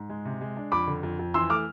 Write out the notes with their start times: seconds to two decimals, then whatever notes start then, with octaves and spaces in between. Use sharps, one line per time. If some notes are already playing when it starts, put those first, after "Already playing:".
Already playing: G#2
0.10 G#3
0.25 C3
0.41 G#3
0.56 D4
0.72 F2 B5 D6
0.87 D3
1.03 F2
1.19 F2
1.34 E3 C6 E6
1.50 A3 D6 F6